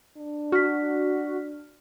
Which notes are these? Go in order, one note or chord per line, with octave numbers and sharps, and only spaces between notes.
D4
F#4 F6 B6